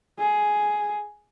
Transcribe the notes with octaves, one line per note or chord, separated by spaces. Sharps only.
G#4